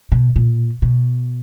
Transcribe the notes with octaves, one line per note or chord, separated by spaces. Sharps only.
B2
A#2
B2